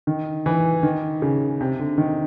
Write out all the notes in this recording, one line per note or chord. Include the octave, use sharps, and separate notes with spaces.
D#3
E3
D#3
C#3
C3
D3
D#3